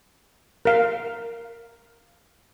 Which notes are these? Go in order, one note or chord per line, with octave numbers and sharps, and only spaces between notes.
A#4 F5